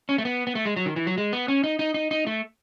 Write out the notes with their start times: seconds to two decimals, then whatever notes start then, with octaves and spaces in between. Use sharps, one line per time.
0.09 C#4
0.18 A3
0.25 B3
0.47 B3
0.55 A3
0.65 G#3
0.76 F#3
0.86 D#3
0.96 E3
1.07 F#3
1.18 G#3
1.33 B3
1.48 C#4
1.64 D#4
1.79 D#4
1.94 D#4
2.11 D#4
2.27 A3